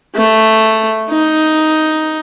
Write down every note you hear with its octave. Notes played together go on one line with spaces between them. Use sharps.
A3
D#4